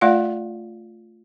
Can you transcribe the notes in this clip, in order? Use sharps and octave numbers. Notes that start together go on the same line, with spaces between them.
A3 F4 D5 F5 F#5